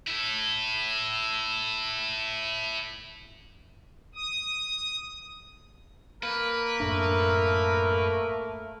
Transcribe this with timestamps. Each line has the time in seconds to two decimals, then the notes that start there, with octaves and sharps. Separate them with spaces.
0.08 E4 A4
4.15 D#6
6.23 A#3 A#4 B4
6.80 F#2 A2 A3 D4